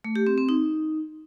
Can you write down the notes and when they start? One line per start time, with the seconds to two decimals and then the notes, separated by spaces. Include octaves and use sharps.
0.04 A3
0.16 G4
0.27 C4
0.38 C4
0.49 D#4